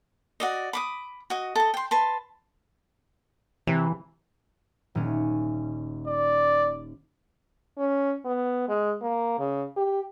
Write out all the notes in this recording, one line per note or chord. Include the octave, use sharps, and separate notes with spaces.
F#4 D5 D#5
B5 D6 D#6
F#4 D#5
A4 D#5
G5 C6
B4 A5 C6
C3 E3
D#1 C#4
D5
C#4
B3
G#3
A#3
C#3
G4